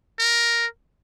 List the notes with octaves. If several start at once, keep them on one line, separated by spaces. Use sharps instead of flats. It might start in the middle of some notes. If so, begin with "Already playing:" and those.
A#4